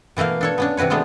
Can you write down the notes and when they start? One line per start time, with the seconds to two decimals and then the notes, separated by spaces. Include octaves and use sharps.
0.17 B2 E3 A3 A#3 F5
0.41 D4 A4 C#5
0.58 B3 C#4 D4
0.77 C3 E3 F#4 B4 C#5
0.90 G#3 A3 B3 D4